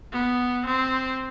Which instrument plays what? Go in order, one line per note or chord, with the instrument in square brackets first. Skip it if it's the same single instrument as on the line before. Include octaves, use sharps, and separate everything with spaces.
[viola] B3
C4